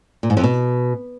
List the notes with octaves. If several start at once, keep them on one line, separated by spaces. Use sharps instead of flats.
A#2
G#2
F2
B2